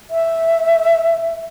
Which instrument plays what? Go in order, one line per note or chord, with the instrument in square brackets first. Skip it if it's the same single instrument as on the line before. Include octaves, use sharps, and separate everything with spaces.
[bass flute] E5